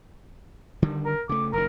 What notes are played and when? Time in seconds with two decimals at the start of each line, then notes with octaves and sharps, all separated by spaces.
0.82 D3 D#3 G3
1.05 A#4
1.29 C#3 A3 D6
1.53 F#1 D#3 A#4